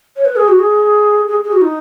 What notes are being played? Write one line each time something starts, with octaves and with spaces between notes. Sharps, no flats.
C#5
B4
G#4
F#4
G#4
G#4
G#4
F#4
D#4